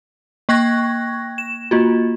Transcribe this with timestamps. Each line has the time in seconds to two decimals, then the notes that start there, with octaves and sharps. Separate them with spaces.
0.49 A#3 G5 C#6 F#6 G#6 A#6
1.38 E7
1.71 A#3 F4 F#4